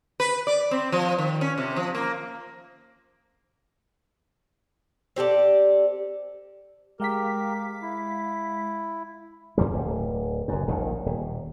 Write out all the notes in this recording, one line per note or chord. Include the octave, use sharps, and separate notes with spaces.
B4
D5
C4
F3
D#3
C#4
C3
F3
A#3
C4 G4 A4 D5
G#3 G4 A#4 F5 B6
E4
F2 F3 G3
D1
F#1 F#2
D#1 A#1 D#3
D#1